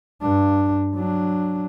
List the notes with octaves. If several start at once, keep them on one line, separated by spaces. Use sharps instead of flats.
G2 D4
F#3 D4